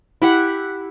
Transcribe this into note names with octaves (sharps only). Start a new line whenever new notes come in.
E4 G4 F#5